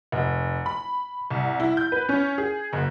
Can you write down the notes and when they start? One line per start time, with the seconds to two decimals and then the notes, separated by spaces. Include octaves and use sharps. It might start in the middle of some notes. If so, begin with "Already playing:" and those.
0.12 F1
0.66 B5
1.31 C2
1.60 E4
1.77 G6
1.92 B4
2.09 C#4
2.38 G#4
2.73 F#1